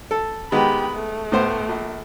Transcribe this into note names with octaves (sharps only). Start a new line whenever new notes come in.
A4
D#3 G#3 B3 G4 B5
A3
A2 B3 C5
A#1